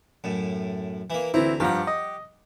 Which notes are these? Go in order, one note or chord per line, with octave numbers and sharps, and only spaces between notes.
F#2 A2
E3 A#3
D2 E3 C4 E4 A#5
G2 F3 G4 F#5 A#5
D#5